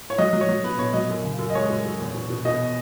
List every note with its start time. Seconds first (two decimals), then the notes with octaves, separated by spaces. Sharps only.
0.10 C#5
0.18 F#3 D#5
0.33 F#3
0.41 C#5
0.49 F#3
0.64 B2 B4
0.79 B2 C#5
0.93 F#3 D#5
1.10 F#2
1.24 C#3
1.39 F#2
1.50 D#5
1.55 G#3 C#5
1.70 F#2
1.85 F#2
2.00 E2
2.14 B2
2.30 B2
2.45 B2 D#5